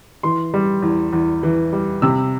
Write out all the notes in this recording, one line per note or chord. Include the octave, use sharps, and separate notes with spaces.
E3 C6
G3
E2
E2
E3
G3
C3 E6